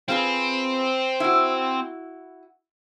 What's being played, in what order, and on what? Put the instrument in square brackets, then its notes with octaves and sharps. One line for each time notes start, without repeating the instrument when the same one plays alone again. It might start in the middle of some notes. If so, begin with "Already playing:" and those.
[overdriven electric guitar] C4 [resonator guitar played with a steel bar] F4 G#4 B4
[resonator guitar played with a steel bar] E4 F#4